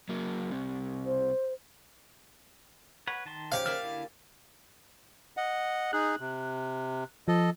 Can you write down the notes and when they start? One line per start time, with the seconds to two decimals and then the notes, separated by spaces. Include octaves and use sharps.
0.09 F#3 A#3
0.50 C2 C3
1.06 C5
3.07 B4 C#5 F#5
3.26 D#3 A5 C6
3.52 C#3 F3 G4 F5
3.66 A#3 D5 E5 F6
3.83 D3 E4
5.37 D#5 F#5
5.93 D#4 G#4 F#6
6.20 C3
7.28 F3 A4 D#5